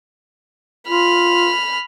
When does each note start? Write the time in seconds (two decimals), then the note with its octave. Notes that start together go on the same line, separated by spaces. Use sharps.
0.88 F4 B5 F6